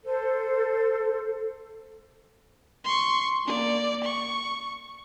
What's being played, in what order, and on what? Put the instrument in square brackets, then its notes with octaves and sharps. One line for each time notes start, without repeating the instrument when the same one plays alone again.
[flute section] A4 C5
[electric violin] C6 C#6
A#3 D5
C#6